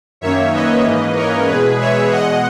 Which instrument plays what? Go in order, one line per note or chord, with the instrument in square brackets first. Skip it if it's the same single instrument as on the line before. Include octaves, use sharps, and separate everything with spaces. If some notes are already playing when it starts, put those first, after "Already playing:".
[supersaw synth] F#2 D#3 A#3 C#4 C#5 E5
B4 D#5
G#2 E3 A#3 C#4
A#4 C#5
E2 B2 G#3 G#4 B4
C#5 E5
E2 B2 G#3 D#5 F#5